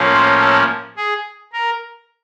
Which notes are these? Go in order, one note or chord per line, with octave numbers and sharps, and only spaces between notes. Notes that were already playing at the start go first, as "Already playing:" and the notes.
Already playing: A2 F3 A#3 C#4
C5
A4
G#4
A#4